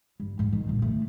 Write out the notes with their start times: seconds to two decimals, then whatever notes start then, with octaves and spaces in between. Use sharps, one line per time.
0.20 G2
0.39 G#2
0.53 D#3
0.69 A#2
0.82 A3